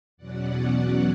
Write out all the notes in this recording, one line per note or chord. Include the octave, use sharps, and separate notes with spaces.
E2 B2 F#3 C#4 D5 F#5